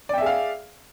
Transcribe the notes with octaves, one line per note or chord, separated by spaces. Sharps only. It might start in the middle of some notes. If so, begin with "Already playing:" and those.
G#4 D5 E5 F5 G5